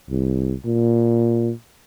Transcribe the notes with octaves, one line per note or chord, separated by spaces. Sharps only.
C2
A#2